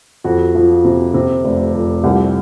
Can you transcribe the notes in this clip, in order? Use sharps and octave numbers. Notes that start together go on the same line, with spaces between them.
F2 F#4
F3
C3
C3
F1
F2
C2 G4